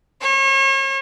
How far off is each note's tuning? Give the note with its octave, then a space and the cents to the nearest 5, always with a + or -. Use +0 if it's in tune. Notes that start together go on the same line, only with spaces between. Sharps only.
C#5 -40